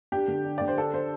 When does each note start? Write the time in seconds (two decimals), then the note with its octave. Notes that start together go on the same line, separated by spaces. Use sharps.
0.12 D4 G4
0.28 D3
0.45 D4
0.58 D3 D5
0.68 C5
0.78 D4 A4
0.94 D4 C5